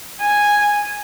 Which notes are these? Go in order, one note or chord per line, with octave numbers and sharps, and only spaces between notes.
G#5